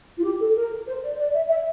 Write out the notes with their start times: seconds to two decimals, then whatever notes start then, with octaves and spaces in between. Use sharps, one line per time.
0.18 F4
0.23 G4
0.40 A4
0.55 A#4
0.87 C5
1.03 D5
1.18 D5
1.34 E5
1.49 E5